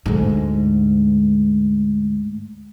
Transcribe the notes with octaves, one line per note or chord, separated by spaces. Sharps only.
D2 G#2